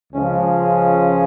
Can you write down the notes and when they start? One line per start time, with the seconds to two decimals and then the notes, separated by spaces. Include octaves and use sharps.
0.13 C#2 C#3 F3 G#3 C#4